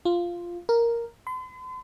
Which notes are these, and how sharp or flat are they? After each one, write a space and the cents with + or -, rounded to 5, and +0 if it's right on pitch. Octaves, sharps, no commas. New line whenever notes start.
F4 -5
A#4 +0
C6 -45